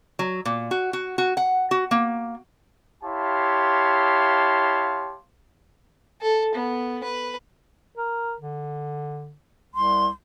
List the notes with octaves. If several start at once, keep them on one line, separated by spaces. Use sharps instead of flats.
F#3
A#2
F#4
F#4
F#4
F#5
F#4
A#3
E4 G4 C#5 F5 A5 C6
A4
B3
B4
A#4
D3
C2 C6